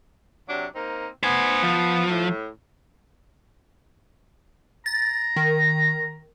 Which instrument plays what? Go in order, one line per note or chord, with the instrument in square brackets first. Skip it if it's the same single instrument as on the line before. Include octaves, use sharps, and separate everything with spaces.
[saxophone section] C3 F#3 D4
A#3 C4 D#4
[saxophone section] B3 [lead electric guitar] C5 G#5
[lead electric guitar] F3
[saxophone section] A2
[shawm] A#5 [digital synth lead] A6
[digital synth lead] D#3